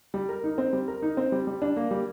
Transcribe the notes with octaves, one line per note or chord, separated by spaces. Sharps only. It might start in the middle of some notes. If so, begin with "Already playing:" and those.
G3
A#4
D#4
C4
G3
A#4
D#4
C4
G3
G3
D4
A#3
G3